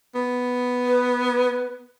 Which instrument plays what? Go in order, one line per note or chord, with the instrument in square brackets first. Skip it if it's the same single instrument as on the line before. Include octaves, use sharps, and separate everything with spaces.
[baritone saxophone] B3
[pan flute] B4